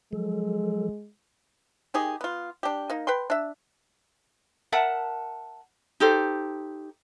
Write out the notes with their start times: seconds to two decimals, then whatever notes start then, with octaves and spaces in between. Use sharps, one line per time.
0.13 F3 F#3 G#3 A4
1.94 D#3 D#4 G4 G#4
2.21 B3 F4
2.63 D4 G4
2.90 A#3 D#4
3.07 B4 G5 C6
3.30 D4 E5
4.72 A#4 E5 F#5 A5
6.00 D#4 G4 A4 C5